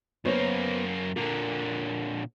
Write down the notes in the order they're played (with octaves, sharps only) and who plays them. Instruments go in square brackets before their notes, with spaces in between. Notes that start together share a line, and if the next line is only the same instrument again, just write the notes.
[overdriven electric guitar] F#2 A#3 [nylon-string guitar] B3 C5 C#5
[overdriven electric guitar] A#2 D3 [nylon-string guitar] A#4